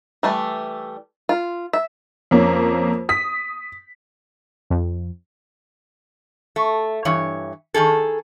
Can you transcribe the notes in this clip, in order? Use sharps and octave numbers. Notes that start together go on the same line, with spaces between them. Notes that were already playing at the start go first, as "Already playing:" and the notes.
E3 G3 A3
F4
E5
F2 A#3 C#4
D#6 B6
F2
A3
G2 E3 C#5
D#3 E3 G#4 A4